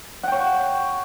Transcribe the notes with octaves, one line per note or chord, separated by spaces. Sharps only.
C#5 F#5 G5